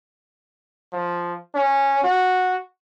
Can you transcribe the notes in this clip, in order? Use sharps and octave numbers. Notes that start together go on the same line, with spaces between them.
F3
C#4
F#4